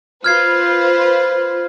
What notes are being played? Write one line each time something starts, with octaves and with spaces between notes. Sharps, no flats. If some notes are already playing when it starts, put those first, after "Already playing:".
F4 B4 C5 F6 G#6 C7